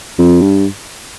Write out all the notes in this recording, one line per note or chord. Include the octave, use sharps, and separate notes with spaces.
F2
G2